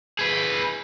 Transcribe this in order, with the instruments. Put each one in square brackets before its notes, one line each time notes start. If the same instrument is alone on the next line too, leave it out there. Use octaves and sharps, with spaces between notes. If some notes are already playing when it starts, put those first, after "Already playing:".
[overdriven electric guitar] G#4 B4